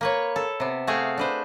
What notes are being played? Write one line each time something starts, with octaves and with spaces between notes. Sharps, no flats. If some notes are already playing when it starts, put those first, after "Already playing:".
A#3 B4 C#5
A4
C3 B3
A3 F#4 G#4 F5 G5
D4 B4 C5